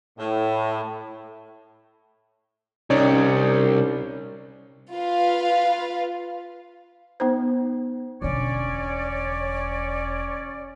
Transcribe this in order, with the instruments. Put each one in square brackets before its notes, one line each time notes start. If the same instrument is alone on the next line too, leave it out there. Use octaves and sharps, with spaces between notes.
[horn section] A2
[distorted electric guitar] C2 [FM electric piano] C#4 [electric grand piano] D#4 C#5 D5
[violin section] F4 B4 F5
[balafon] B3 D#4 C5
[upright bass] E1 D3 [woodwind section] C#4 C#5 D5